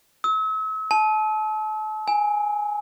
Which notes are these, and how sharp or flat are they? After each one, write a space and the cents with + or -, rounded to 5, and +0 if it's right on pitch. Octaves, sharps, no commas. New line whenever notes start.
E6 -40
A5 -35
G#5 +0